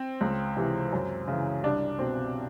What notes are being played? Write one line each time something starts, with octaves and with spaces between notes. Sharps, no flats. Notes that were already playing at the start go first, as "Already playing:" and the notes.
Already playing: C4
C#2
C3 E3
F#2
C#3 E3
C2 D4
B2 C4